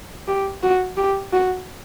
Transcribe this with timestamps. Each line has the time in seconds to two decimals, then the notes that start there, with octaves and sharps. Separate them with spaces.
0.28 G4
0.63 F#4
0.97 G4
1.32 F#4